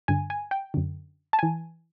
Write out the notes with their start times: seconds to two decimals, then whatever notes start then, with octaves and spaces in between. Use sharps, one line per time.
0.08 G2 D3 G#5
0.30 G#5
0.51 G5
0.74 F#2 D3
1.33 A5
1.39 E3 G#5